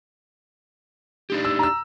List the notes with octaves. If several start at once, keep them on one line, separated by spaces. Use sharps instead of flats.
D4 D#4 G4
E6
A#5 E6